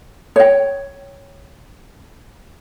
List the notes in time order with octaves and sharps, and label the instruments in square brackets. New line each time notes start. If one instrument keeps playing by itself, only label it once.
[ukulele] C#5 G5